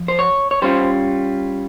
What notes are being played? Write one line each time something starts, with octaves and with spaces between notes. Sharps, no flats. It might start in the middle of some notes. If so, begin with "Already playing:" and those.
Already playing: F3
C5
C#5
C#5
G3 C#4 F4 C5